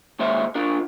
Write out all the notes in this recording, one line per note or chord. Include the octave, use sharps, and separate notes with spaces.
D#2 G#3 C5 C#5 E5
D4 F4 A#4